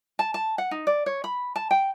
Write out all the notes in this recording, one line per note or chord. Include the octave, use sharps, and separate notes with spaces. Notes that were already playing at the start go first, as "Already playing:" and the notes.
A5
A5
F#5
D#4
D5
C#5
B5
A5
G5